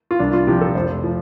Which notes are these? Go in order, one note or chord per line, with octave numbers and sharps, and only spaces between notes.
F4
C2 D4
F4
C3 F3 G4
A4
F1 C5
F3